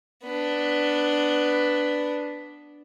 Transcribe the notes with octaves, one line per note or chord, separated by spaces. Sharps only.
B3 D4